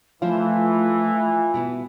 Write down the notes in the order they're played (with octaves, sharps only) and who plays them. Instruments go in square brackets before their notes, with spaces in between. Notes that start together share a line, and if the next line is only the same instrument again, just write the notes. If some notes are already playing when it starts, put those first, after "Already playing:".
[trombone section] E3 [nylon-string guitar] F3 E4 C5 [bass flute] A3 [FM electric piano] F4
[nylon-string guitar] B2 B3 E4